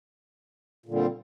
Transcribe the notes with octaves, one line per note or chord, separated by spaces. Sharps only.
A#2 D3 G3 C4